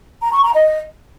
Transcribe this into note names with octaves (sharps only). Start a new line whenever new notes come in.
A#5
C#6
A#5
D#5